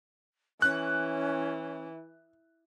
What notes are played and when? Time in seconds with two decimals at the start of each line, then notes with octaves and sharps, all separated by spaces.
0.62 E3 C#4 F#6